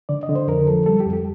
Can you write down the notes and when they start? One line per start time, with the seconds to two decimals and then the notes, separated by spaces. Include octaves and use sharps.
0.09 D3 D5
0.23 D#5
0.29 D3
0.35 C5
0.48 F2 A#4
0.68 F3 A4
0.86 G3 A4
1.00 G4
1.05 F2
1.13 G4